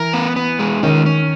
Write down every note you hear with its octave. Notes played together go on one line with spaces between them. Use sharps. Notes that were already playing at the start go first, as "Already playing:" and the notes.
Already playing: E3 A#4
B3
B3
G#3
D#3 C#4
C#4